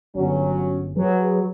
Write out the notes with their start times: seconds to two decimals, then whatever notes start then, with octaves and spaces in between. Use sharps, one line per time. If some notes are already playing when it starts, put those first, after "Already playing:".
0.15 G1 F#3 C#4
0.97 F#3 G#4 B4